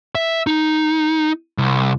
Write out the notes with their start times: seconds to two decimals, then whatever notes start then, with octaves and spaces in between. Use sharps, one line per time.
0.15 E5
0.47 D#4
1.58 C2